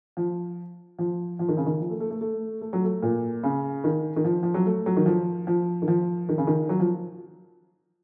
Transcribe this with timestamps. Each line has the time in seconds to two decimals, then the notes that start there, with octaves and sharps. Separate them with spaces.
0.17 F3
0.99 F3
1.39 F3
1.48 D#3
1.57 C#3
1.66 D#3
1.80 F3
1.90 A3
2.00 A3
2.10 A3
2.21 A3
2.61 A3
2.73 F#3
2.84 A3
3.02 A#2
3.43 C#3
3.84 D#3
4.16 D#3
4.25 F3
4.43 F3
4.54 F#3
4.66 A3
4.86 F#3
4.96 D#3
5.06 F3
5.47 F3
5.82 D#3
5.88 F3
6.29 D#3
6.38 C#3
6.47 D#3
6.69 F#3
6.80 F3